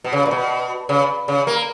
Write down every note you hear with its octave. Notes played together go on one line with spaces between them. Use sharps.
B2
C#3
A#2
B2
C#3
C#3
A#3